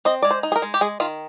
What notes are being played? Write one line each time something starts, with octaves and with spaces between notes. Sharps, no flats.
C4 D#5
G#3 D5
C5
D#4
G#4
A#4
G#3
G4
G#3 G#4
D#3 F4